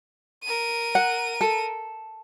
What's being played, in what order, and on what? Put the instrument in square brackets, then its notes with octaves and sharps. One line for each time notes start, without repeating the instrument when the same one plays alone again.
[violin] A#4 D#7
[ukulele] F#5
A4